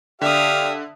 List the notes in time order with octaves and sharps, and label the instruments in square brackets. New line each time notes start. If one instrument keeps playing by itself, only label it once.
[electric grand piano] D3 [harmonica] G4 F5 [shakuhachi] D5 [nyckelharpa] E5 D#6